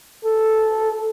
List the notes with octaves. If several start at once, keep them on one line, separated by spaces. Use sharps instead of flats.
A4